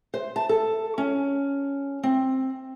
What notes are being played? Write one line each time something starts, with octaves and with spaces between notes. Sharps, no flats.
C5
A5
A4
C#4
C4